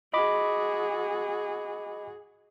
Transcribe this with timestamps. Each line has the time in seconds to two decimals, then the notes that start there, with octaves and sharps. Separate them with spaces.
0.13 F#4 G#4 D#5 B5 D6